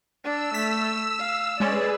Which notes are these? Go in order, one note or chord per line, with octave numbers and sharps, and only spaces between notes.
D4 E6
A3 B6
F5
G#3 C#4 G#4 B4 D5